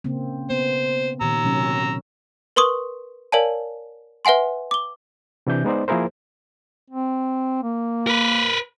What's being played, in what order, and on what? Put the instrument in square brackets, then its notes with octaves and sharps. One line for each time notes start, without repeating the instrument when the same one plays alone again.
[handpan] C#3 A#3 C4
[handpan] B3 [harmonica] C5
[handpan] A#2 D#3 [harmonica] A#5 E6
[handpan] C3 F#3 C#4
[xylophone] A#4 B4 C6 C#6 D#6
A#4 C#5 D5 F5 G#5 A5
B4 E5 F#5 G#5 C6
D6 G7
[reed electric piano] C3 E3 D4 G6
G#3 B3 D#4 C5 D5
F3 A#3 E4 G#4 A#4 C5
[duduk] C4
A#3
[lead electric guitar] A#4 B4